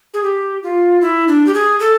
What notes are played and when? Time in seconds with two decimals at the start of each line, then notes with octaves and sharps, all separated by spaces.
0.14 G#4
0.23 G4
0.63 F4
1.01 E4
1.28 D4
1.47 G4
1.54 G#4
1.80 A4